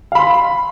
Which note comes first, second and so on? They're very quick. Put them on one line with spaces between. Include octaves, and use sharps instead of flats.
F5 B5 C6